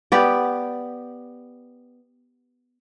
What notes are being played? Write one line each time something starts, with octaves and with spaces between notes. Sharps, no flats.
B3 G4 D5